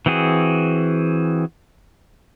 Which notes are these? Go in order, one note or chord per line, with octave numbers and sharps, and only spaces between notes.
E3 C4 F#4 G#4